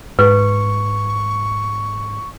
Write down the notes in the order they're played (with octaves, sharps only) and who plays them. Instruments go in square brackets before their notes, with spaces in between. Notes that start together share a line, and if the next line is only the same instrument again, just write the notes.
[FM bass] G#2 [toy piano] B4 [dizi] C#6